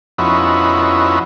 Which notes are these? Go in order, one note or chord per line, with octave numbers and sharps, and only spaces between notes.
F2 B3 C#4 D#4 E4 F#4